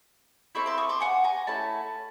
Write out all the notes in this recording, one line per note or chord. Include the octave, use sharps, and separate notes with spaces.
C4 E4 A4 B5 C#6
C6 D6
C#6 D#6
C6 D6
F#5 G#5
G#5 A#5
A3 C#4 E4 A5 B5